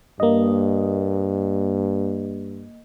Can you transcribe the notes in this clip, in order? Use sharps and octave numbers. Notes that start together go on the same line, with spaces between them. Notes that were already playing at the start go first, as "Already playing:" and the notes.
G2 A#3 D#5